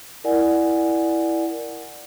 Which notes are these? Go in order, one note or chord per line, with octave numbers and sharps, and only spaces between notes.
E4 A#4 D5 F#5 G#5